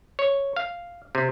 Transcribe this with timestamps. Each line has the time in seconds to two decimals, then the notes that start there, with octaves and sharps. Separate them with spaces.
0.19 C#5
0.56 F5
1.15 C3